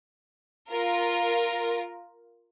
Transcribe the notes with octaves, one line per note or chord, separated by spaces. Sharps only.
F4 A#4